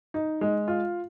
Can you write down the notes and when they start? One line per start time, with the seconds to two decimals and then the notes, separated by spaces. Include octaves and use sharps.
0.14 D#4
0.41 G#3
0.68 F4